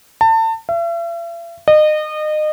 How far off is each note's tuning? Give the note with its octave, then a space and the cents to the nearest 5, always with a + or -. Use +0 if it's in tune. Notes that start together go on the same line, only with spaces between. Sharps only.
A5 +30
E5 +45
D#5 -30